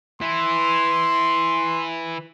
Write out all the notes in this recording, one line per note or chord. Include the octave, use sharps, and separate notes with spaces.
E3 E4 C6